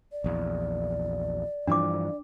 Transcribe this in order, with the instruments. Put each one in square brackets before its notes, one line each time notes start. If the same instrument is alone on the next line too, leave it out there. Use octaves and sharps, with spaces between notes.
[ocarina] D5
[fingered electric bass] A#1 E2
[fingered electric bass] G2 E3 F3 [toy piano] D4 D6